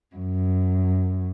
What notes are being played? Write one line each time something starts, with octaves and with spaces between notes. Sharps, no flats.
F#2